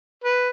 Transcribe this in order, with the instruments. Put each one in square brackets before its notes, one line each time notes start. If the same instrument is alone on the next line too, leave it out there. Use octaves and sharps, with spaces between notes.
[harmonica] B4